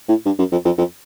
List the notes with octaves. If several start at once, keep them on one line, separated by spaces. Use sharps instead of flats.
A2
G2
F#2
F2
F2
F2